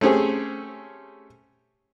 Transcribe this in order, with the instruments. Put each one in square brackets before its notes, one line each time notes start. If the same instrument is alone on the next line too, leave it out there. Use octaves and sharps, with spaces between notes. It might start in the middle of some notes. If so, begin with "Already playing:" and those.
[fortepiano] A3 C4 C#4 G4 G#4